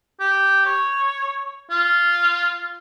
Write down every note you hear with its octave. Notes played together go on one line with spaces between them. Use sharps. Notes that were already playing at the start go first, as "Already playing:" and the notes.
G4
C#5
F4